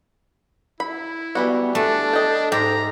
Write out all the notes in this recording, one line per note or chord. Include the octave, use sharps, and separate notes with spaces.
E4 B5
E3 G3 B3 F#4
A3 D4 A4
D#5 G5
G#2 G4 A4 A#5